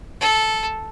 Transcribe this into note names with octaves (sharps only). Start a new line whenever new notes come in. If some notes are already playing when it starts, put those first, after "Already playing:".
A4